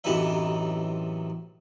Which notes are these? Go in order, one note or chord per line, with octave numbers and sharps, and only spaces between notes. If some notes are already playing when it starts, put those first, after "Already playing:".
A1 F#2 C3 E3 D#4 E5